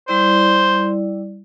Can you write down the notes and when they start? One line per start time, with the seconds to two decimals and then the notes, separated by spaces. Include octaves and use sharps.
0.08 G3 E4 C5 D5